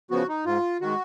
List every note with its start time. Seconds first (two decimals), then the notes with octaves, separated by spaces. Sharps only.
0.11 C#3 F3 B3 F#4
0.29 D#4
0.46 G#2 F4
0.81 D#3 G#3 F#4